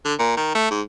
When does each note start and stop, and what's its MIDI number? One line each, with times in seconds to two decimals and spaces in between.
0.05 0.14 50
0.19 0.35 46
0.37 0.51 51
0.55 0.70 57
0.71 0.81 44